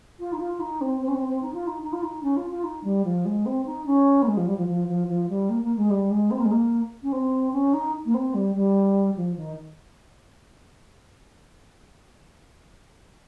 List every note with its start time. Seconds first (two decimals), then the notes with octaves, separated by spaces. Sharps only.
0.19 F4
0.32 D#4
0.40 F4
0.60 D#4
0.81 C4
1.01 C4
1.08 C#4
1.15 C4
1.28 C4
1.42 D#4
1.54 F4
1.67 D#4
1.82 D#4
1.93 F4
2.03 D#4
2.23 C#4
2.37 F4
2.50 F4
2.64 D#4
2.84 G3
3.05 F3
3.25 G#3
3.46 C4
3.66 D#4
3.86 C#4
4.22 A#3
4.27 G#3
4.37 F3
4.47 G3
4.57 F3
4.67 F3
4.88 F3
5.08 F3
5.29 G3
5.49 A#3
5.63 A#3
5.77 G#3
5.90 G3
6.10 G#3
6.31 C4
6.38 A#3
6.45 G#3
6.51 A#3
7.03 C#4
7.12 C4
7.53 C#4
7.74 D#4
8.05 A#3
8.14 C4
8.34 G3
8.55 G3
9.16 F3
9.37 D#3